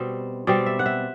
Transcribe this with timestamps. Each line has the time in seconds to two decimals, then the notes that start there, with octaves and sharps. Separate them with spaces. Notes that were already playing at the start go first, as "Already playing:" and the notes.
Already playing: B2 G3 C4
0.47 B2 G3 C4 D5
0.66 E5
0.79 F#5
0.86 E5